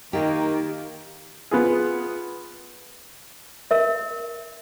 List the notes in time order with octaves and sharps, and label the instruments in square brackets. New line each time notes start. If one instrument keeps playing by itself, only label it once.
[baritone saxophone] D#3 [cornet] A#3 [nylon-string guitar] G4
[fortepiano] B3 F4 G#4
[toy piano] A#4 E5